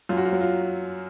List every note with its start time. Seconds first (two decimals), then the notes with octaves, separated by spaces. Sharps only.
0.09 F#2 F4
0.17 F#4
0.25 F4
0.32 F#3 F#4
0.41 F4